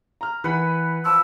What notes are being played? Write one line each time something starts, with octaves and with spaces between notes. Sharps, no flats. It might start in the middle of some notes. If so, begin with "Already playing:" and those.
A#5 F6
E3 B4 F#5 B5
F3 E6